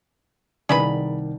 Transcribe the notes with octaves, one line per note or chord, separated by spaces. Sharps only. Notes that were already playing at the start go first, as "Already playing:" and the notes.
C2 D#3 G#4 B4 D5 B5